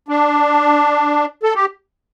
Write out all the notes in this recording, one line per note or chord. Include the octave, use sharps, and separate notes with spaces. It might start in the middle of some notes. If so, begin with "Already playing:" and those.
D4
A4
G4